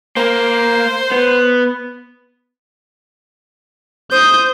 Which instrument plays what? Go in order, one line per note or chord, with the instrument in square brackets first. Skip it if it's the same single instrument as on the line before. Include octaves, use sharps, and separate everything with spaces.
[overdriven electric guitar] A#3 [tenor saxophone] C5
[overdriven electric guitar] B3
[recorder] C5 [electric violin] D#6 G6